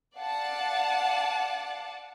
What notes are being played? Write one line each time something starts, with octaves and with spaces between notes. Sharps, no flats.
D5 F5 F#5 A5